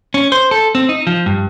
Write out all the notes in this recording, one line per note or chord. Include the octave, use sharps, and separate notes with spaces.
C#4
C5
A4
C4
D#4
F3
G2